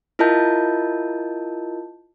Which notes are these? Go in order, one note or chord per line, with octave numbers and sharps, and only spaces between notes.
E4 F4 A#4 D#5 A5 G6